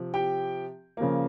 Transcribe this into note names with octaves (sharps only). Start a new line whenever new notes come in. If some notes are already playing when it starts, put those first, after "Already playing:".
Already playing: C3 F3
G4 G5
C#3 F3 A#3